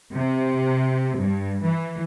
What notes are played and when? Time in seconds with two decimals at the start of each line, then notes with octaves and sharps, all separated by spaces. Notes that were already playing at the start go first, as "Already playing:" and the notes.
0.14 C3
1.19 G2
1.63 E3